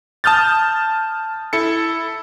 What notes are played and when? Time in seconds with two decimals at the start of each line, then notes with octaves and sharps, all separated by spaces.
0.24 A5 D#6 F6 G6 A6
1.53 E4 A4 C#7